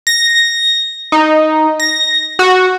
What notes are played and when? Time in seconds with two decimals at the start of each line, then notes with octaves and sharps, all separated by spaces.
0.07 A#6
1.12 D#4
1.80 A#6
2.39 F#4